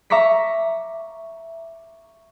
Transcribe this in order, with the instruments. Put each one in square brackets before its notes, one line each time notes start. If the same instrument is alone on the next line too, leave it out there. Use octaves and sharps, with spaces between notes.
[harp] E5 A#5 C#6 D6 B6